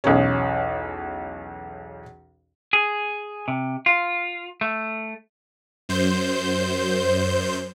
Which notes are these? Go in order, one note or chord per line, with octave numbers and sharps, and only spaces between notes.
B1 E2 C#4
G#4
C3
F4
A3
F#2 C5 G6